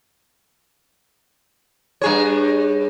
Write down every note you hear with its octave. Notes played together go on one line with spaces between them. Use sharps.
G2 G#4 C#5